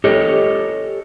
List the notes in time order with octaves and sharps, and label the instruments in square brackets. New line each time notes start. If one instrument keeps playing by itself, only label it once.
[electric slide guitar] G4 A4 C#5 D#5